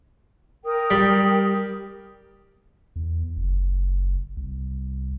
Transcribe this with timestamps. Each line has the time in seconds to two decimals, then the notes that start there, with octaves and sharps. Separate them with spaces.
0.64 A#4 G5 D#6
0.91 G3
2.96 E2
3.37 F#1
4.37 C2